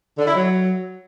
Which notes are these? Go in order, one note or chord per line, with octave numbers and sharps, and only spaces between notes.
D3
E4
F#3